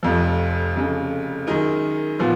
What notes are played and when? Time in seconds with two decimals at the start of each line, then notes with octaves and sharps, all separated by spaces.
0.03 F1 F2 F3
0.75 F1 F2 C#3
1.47 F#2 D#3 G#3 D#4 A#4
2.19 A#2 F3 B3